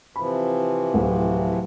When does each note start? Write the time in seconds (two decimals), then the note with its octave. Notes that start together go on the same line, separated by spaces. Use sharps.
0.16 C3 E3 F3 B5
0.94 D1